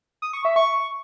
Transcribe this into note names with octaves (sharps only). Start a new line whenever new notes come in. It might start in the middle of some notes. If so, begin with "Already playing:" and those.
D#6
C#6
E5
C#6